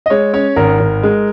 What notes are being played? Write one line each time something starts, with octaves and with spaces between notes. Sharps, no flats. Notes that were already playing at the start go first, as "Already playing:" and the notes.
D#5
G#3 C#5
C#4 C#5
G#1 A#4
G#1
G#3